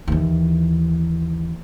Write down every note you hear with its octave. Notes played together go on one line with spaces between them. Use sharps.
D#2 E3